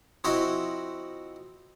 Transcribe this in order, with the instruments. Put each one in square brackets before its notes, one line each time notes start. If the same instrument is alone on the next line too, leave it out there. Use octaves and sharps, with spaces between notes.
[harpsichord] F3 C4 E4 F#4 D#5 E5